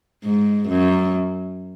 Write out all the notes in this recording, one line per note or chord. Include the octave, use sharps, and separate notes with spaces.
G#2
F#2